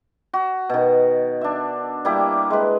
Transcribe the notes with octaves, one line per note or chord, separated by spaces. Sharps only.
F#4
B2 D#3
D4 E5
G3 A#3 E4 G4
G#3 B4